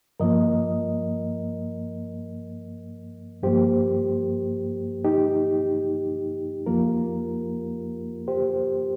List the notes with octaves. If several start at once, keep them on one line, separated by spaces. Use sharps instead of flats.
G2 F3 A#3 A#4 D#5
G2 F3 A#3 G4 C5
D#4 G4
F2 F3 A#3 F4 A#4
G4 C5